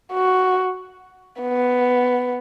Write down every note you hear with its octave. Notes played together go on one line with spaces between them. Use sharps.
F#4
B3